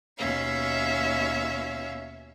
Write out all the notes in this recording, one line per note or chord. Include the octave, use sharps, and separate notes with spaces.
D#2 B2 C#4 E5 F5